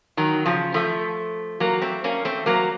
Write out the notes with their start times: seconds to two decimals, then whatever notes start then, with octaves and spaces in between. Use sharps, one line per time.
0.17 D#3 F#3
0.45 C#3 F3
0.74 F3 A3
1.60 F#3 A#3
1.82 A3 C4
2.04 A#3 C#4
2.25 A3 C4
2.46 F#3 A#3